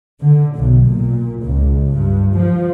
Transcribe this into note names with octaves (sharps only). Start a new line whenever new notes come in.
D3
B1
A#2
C#2
G2
F3